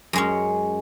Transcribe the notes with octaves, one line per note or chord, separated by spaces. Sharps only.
F#2 G#3 C#4